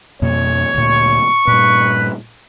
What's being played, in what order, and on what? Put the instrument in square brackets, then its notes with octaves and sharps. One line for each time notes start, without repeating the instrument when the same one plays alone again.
[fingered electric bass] F2 B2 A#3 [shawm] C#5
[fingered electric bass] D2 A#2 [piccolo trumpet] C#6
[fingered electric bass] G2 A#2 [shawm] B4